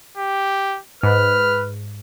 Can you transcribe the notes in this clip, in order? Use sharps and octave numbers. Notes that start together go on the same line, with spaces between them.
G4
G#2 B4 F6